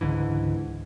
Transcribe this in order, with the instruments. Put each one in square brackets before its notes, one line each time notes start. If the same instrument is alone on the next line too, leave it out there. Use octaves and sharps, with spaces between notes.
[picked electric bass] C#2 G#2 D3 E3